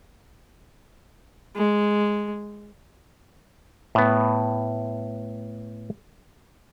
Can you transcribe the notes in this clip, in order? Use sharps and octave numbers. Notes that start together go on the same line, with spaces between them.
G#3
A2 B3